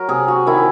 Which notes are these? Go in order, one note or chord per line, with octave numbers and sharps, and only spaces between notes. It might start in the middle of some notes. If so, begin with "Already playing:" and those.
Already playing: F#3 A#4
C3 G#4
F#4
D#3 E4